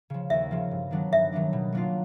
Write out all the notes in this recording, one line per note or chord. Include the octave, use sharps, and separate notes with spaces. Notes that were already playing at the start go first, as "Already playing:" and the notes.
C#3 F3
D#2 E5
C#3 F3
G2
D#3 F#3 B3 D4
G2 E5
D#3 F#3 B3 D4
B2
F#3 A#3 D4 F4